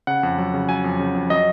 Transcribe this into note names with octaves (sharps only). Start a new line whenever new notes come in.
C#3 F#5
F2
F#3
C#3
F#3 G#5
F2
C#3
F2
F#3 D#5